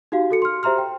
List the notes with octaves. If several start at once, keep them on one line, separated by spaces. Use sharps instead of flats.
D#4 F#4 G4 F5
F#4 A4 C#7
C6 F6
G4 C5 E5 A#5 C6 F6
G5